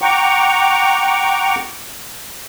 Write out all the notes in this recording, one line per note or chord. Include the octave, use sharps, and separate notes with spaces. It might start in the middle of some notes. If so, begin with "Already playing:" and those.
F#5 G5 A#5 C#6 D6